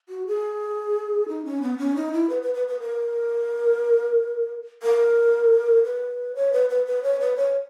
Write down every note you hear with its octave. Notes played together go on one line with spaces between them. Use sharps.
F#4
G#4
D#4
C#4
B3
C#4
D#4
E4
B4
B4
B4
B4
A#4
A#4
B4
C#5
B4
B4
B4
C#5
B4
C#5